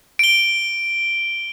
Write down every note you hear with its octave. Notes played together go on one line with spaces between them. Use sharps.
D7 G7